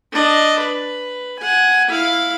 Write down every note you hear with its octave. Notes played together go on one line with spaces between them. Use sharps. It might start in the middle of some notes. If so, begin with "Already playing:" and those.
D4 D#5
B4
F#5 G#5
E4 F5